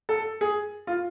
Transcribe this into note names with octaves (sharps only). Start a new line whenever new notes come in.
A4
G#4
F4